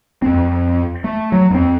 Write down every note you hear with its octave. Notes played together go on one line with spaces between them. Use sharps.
F2 C4
A3
F#3
F2 C4